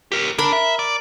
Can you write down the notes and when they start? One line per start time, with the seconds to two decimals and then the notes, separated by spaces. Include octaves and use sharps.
0.12 G4 A#4
0.38 D4 A#4 B5
0.52 E5
0.79 D5